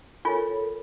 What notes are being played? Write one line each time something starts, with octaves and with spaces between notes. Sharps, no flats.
F4 A4 A#4 C#5 G#5